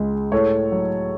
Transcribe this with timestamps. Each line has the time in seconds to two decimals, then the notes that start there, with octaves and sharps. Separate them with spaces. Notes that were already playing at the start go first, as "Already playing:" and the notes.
Already playing: C#2 G#3
0.32 A2 A4 C#5
0.72 F#3